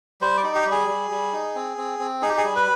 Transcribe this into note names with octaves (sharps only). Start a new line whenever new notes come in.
G3 C5
D5
D#4
G4
G3
G#4
G3
G3
D#4
C4
C4
C4
D#4 G#4
G4
G#4
G3
B4